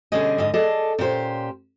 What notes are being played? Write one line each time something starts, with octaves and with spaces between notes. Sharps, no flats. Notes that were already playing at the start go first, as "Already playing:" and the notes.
B2 D3 G3 C#4 G#4 D#5
G#2 D3 D#5
G#4 A4 D5 D#5 A5
A#2 C#4 E4 G4 C5